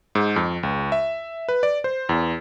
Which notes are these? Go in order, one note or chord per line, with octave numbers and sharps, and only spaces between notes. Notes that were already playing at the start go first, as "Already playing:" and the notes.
G#2
F2
C#2
E5
B4
D5
C5
E2